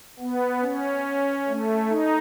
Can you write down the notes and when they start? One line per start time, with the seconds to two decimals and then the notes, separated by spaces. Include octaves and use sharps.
0.20 B3
0.63 C#4
1.48 A3
1.89 D#4